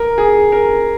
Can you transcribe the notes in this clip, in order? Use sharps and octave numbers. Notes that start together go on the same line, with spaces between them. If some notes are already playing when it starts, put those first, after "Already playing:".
Already playing: A#4
G#4
A#4